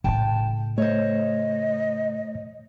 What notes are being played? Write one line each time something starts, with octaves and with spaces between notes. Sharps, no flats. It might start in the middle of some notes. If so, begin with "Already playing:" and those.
A2 C#3 G5 A5
A3 C5 C#5 D#5